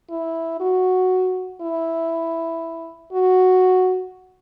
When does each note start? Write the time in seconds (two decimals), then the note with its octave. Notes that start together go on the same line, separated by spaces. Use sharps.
0.11 E4
0.61 F#4
1.61 E4
3.12 F#4